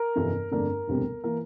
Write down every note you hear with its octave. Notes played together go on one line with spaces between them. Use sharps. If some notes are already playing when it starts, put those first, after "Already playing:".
Already playing: A#4
G1 F2 C3 E3
G1 F2 D3 A3 D4 A#4
E1 D2 C3 G3 C4
E3 A#3 A#4